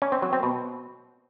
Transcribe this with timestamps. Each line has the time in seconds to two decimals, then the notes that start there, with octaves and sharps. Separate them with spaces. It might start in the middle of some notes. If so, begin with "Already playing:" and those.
0.02 C#4
0.12 C4
0.22 F#3
0.33 C4
0.43 B2